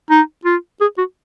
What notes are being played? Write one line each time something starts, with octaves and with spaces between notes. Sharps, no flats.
D#4
F4
G#4
F#4